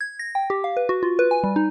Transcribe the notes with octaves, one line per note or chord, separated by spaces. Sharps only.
G#6
A#6
G5
G4
F5
B4
F#4
F4
B4
G#5
G3
D#4